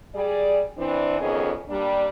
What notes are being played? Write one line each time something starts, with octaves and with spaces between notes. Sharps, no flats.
G3 G#4 D5
E3 C4 D4
F2 D#3 B3 C#4 G#4 D#5
G3 A#3 D4